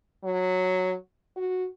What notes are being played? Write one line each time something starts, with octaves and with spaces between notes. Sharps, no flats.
F#3
F#4